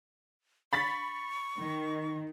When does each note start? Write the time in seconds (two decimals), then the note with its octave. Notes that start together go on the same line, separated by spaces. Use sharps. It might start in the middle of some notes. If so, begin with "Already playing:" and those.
0.73 B5 C#6 A6 B6
1.57 D#3